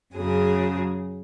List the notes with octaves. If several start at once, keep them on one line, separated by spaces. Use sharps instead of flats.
F#2 C#3 F#3 G#4